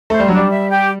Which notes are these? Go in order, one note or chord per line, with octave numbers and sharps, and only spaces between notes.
A3 C5
G3
F#3 D4
G3
E5
G4